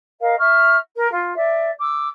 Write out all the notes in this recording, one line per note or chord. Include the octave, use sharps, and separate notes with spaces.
A#4 D#5 F5
E5 C#6 F6
A#4
F4
D5 E5
D6 E6